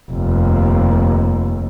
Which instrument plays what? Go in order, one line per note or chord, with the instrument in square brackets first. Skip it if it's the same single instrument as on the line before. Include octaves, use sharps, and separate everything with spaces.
[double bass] F1 D#2